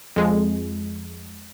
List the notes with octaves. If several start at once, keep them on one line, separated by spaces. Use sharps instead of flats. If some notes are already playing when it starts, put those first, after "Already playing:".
F2 G#3